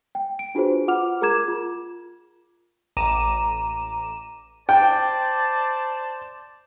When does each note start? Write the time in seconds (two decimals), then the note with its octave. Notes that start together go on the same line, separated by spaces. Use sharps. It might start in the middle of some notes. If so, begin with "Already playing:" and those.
0.15 G5
0.39 D7
0.55 D4 F4 F#4 G#4 B4 C5
0.88 F4 F#5 D6 F6 F7
1.22 G#4 A#4 A#5 D6 G#6 E7
1.48 F4
2.97 A1 A#5 D6 D#7 E7
4.69 C5 D5 G5 A5